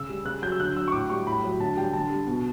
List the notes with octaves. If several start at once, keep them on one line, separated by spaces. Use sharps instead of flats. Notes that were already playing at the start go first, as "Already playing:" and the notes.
Already playing: C#3 E6
G3
C#3 F#6
F#3 G6
E6
D3 F#6
F#3 E6
C#6
A2 D6
G3 C#6
A2 B5
F#3
D3 A5
G3 G5
D3 A5
G3
B2